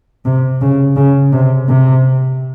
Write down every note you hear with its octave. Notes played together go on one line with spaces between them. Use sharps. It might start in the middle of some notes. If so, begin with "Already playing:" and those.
C3
C#3
C#3
C3
C3